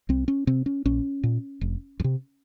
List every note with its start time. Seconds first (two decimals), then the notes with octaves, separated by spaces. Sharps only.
0.09 C2 C4
0.28 C#4
0.47 C3 C4
0.66 C#4
0.86 A#1 C#4
1.23 A#2
1.61 F1
2.00 F2
2.04 C3